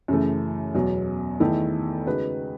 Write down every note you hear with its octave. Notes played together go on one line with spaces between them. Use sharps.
F#2 C#3 E3 A3
E2 B2 F#3
E2 D#3 A3 E4 A4
C#3 G#3 D#4 F#4 B4